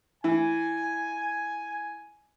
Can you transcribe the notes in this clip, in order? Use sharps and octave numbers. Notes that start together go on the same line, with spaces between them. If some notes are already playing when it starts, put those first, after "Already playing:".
E3 G#5